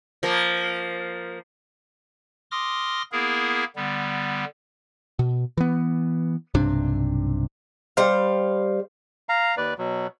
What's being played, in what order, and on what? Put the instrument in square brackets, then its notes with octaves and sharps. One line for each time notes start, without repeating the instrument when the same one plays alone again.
[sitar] F3 A#3
[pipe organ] C6 D6 D#6 F6 A#6
A#3 B3 E4 G#4 A#4
D3 G3 B3
[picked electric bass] B2
E3 B3
B1 G2 C3 D4
[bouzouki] G3 C5 F5
[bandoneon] F5 A#5
D#2 B4 D5
B2 F#3